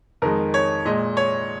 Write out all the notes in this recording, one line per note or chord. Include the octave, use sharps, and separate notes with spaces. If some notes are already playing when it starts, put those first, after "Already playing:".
F2 D#3 G#3 A#4
C#5
A#2 G#3 D#5
C#5